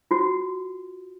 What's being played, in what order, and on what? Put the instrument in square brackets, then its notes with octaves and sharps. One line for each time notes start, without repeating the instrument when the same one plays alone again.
[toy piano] F4 F#4